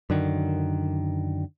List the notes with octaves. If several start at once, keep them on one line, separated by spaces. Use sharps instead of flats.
F#2 D3 D#3